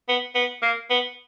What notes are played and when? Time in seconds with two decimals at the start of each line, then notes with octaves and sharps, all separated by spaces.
0.09 B3
0.35 B3
0.62 A#3
0.90 B3